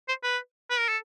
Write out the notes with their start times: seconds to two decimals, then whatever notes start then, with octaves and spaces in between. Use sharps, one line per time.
0.08 C5
0.23 B4
0.70 B4
0.79 A#4
0.89 A4